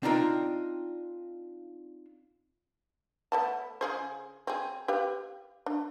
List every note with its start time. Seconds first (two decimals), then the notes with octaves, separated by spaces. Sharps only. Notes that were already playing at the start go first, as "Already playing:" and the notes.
0.03 C4 D4 D#4 F4 A#4 G5
3.32 A3 B3 A5
3.81 C#3 G#4 C5
4.47 C4 G#4
4.88 G4 B4 F5
5.66 D4